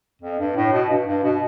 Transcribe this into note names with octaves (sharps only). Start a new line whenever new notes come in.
F2
G2
A2
B2
G2
G2
B2